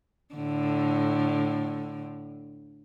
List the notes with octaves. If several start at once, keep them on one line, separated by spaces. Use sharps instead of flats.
A2 D3